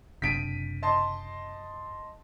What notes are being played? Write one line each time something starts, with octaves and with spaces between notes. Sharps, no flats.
F#1 C3 D4 B6 D7 D#7
D#5 A5 C6